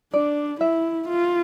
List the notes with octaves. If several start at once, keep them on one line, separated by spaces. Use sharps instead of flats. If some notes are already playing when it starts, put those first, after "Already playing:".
D4 D5
E4 E5
F4